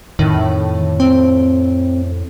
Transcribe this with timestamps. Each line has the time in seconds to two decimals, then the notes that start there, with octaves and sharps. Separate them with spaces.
0.19 F2 A2 D#3
1.00 C4